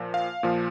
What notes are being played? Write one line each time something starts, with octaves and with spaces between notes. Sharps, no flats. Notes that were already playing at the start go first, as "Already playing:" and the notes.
Already playing: A#2 F3
F5
A#2 F3